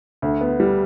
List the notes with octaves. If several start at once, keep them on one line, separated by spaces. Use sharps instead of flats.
D2
B3
G3